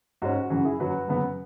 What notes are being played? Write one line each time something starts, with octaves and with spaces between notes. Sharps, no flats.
G#2 G#3 C#4 F#4
F#4
F#2 C#3 E3 F#4
E4 G#4
F#2 F#3 C#4 F#4 B4
F#2 C#3 F#3 B3